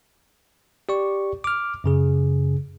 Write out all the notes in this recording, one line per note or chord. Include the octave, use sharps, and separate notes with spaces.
G4 D5 C#6
D6 F6
F#2 C#3 G#4